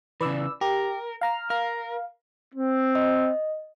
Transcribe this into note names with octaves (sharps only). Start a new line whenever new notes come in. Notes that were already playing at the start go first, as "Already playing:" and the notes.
C#3 E3 B4 D5 E6
G4 A#4
F5 A#5 F6
A#4 F5
C4
D#5